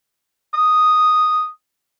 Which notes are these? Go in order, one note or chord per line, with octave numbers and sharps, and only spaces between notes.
D#6